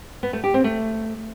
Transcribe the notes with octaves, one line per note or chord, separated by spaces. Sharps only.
B3
A3
G4
C4
A3